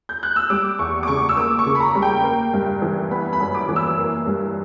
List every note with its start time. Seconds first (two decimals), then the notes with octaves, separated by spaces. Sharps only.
0.09 G6
0.23 F#6
0.36 E6
0.50 G3 D6
0.79 E2 C#6
1.03 D6
1.08 C#3 C#6
1.29 E6
1.37 A#3 D6
1.59 C#6
1.66 C#3
1.75 B5
1.80 A#5
1.95 G3
2.02 G5
2.24 A#3
2.53 G2
2.82 E3
3.11 B3 B5
3.33 B5
3.40 F#2
3.55 D6
3.69 E3
3.76 E6
3.98 A#3
4.27 G2